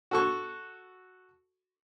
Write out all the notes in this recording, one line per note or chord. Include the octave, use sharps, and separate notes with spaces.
F#4 A4 C#6